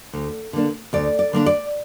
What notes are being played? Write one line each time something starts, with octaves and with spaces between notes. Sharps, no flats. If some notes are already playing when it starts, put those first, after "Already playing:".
D2
D3 A#3 D4
D2 D5
D5
D3 A#3 D4
D5